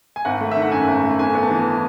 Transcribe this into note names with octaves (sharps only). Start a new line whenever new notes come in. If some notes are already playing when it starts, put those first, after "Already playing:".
G#5
G#1 F#5
A3
D#3 E5
F#5
F#2 G#5
G#1
A3
G#1 G#5
B3
A5
E3